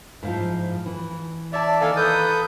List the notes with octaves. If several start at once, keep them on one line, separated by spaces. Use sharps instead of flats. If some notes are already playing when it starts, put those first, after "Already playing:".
G#2 F3 E4 F5
E3
C#5 D5 E5 A5
D#3 A#3 A4 F5 G#5
A4 B4 D#6 G6